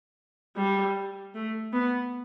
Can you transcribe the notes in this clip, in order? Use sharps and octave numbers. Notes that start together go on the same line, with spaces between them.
G3
A3
B3